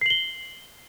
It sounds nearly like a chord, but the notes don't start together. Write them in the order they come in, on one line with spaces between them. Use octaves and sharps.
C7 F#7 G7